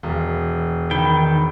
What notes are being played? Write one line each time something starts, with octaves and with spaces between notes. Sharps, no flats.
E1
D#3 G5 B5